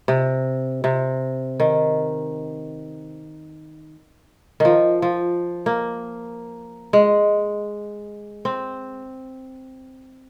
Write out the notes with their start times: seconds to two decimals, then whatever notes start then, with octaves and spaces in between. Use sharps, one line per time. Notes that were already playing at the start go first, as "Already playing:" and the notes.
0.08 C3
0.84 C3
1.60 D#3
4.60 D#3 F3
5.02 F3
5.66 A#3
6.93 G#3
8.45 C4